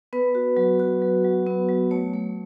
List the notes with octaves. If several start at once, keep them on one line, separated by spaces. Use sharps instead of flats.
B3 B4
F#4
F#3
F#4
F#3
F#3
B3
F#3
A3 C#5
A3